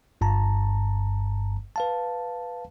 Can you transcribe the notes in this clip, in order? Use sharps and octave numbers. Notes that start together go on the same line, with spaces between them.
G1 G2 A5 A#5
B4 F5 A5